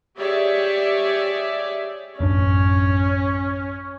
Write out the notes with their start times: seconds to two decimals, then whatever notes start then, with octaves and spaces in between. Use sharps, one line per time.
0.17 G4 G#4 C#5 D5 E5
2.21 A1 F#2 C#4 D4